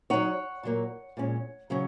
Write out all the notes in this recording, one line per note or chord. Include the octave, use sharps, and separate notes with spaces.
F#3 D#4 C#5 F#5
A#2 F#3 A#3
A#2 G#3 C#4
C#3 F#3 C#4